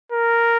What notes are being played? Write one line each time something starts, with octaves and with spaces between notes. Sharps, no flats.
A#4